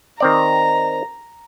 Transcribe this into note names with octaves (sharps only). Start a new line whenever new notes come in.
D#3 C4 D5 A#5